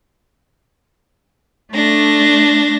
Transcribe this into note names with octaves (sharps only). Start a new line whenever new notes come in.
A3 D4 A#6